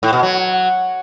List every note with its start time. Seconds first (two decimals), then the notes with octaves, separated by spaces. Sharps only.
0.03 A2
0.13 B2
0.23 F#3